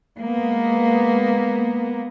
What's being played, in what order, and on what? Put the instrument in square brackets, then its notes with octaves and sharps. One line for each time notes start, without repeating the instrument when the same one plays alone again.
[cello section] G#3 A#3 B3